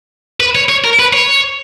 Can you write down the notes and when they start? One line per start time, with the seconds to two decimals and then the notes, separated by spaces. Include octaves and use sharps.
0.40 B4
0.55 C#5
0.69 C#5
0.84 A#4
0.99 B4
1.13 C#5